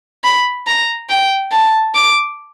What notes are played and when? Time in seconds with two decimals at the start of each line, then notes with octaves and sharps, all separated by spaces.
0.24 B5
0.67 A#5
1.09 G5
1.52 A5
1.95 D6